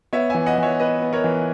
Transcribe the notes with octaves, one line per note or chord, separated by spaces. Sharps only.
B3 C#5 E5
E3 E5 G#5
D#5 F#5
E3 C#5 E5
B3 B4 D#5
B3
A#4 C#5
E3